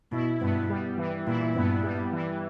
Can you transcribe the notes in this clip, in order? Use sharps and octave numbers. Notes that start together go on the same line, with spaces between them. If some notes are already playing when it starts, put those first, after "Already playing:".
B2 E4
G2 B3
G3
E3
A#2 E4
G2 B3
G3
E3